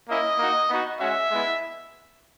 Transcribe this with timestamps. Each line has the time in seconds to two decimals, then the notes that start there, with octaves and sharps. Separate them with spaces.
0.08 A#3 C#4 E4 D#5
0.38 A#3 D#4 F#4
0.70 B3 D#4 F#4
1.00 G#3 C#4 F#4 E5
1.31 G#3 B3 E4